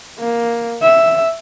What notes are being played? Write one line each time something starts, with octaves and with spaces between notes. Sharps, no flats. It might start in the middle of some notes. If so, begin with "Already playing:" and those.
A#3
E5